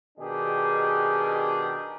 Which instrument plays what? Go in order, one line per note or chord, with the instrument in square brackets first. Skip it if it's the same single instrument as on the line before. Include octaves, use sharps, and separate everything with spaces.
[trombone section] B2 D#3 D4 G4 G#4